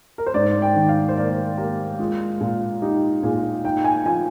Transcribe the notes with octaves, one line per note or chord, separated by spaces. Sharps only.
A#4
C5
G#2 D5
G5
D#3
F5
C5
A#3 D5
A#3 G4
G#3 F4
A#2
D#4 G4
A#2 G#4
D#4 G5
G#5
F3 G#5